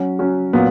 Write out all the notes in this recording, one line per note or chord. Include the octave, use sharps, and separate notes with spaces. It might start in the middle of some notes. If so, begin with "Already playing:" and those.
Already playing: F#3 C#4 F#4
F#3 C#4 F#4
A#2 F#3 B3